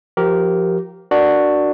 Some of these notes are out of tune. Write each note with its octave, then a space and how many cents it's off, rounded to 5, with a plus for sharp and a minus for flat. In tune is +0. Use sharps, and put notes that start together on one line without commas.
F3 +0 G4 -20 A#4 +0
D4 +10 F#4 +0 A#4 +0